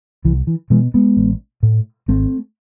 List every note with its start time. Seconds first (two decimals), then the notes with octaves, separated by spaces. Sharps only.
0.25 C2 E3
0.47 E3
0.70 B2 E3 G#3
0.94 G#3 B3
1.17 A1
1.63 A2
2.08 G#1 A3 C4